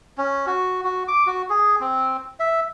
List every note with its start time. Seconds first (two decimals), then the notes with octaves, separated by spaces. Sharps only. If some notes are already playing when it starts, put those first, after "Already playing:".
0.18 C#4
0.47 F#4
0.84 F#4
1.08 D6
1.27 F#4
1.50 G#4
1.80 C4
2.40 E5